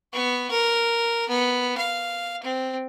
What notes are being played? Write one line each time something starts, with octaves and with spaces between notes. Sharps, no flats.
B3 C#6
A#4
B3
F5
C4